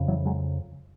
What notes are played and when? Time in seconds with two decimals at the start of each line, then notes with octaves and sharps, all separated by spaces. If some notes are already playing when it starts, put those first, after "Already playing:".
Already playing: F2 C#3
0.08 E3 F#3
0.25 F#3 G#3